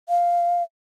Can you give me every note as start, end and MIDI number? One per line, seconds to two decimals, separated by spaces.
0.09 0.63 77